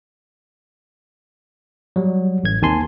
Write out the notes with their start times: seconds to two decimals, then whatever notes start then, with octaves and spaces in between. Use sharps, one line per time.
1.96 F#3 G3
2.44 A1 G#6
2.62 D#2 D#3 C4 G#5 A5 C6